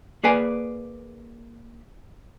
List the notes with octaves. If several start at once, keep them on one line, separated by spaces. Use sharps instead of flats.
A#3 G#4 B4 D5 G#5